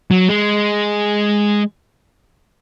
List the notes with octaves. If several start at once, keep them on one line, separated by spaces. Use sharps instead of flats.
F#3
G#3